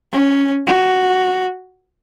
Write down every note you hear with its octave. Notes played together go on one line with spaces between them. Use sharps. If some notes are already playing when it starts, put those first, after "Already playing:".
C#4
F#4